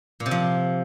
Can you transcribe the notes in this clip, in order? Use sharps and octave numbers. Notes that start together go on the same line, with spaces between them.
A#2
C3
F3